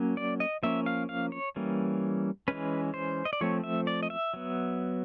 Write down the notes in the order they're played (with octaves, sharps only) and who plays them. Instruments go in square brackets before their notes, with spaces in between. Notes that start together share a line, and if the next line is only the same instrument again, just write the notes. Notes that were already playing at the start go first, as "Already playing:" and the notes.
Already playing: [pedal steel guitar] F#3 A#3 C#4
D5
D#5
F3 A#3 C#4 E5
F5
F5
C#5
E3 G3 A#3 C#4
E3 G#3 C#4 B4
C5
D#5
D5
F3 A3 C4 C#5
E5
D5
D#5
E5
F#3 B3